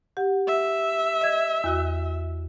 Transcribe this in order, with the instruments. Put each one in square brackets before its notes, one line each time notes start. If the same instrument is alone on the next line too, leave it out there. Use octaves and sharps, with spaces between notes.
[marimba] G4 F#5
[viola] E5
[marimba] D#5 G#6
E2 F#4 E6